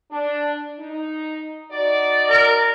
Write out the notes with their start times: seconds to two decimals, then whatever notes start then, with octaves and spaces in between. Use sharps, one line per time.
0.11 D4
0.80 D#4
1.72 D#4 F#4 D5
2.30 A#4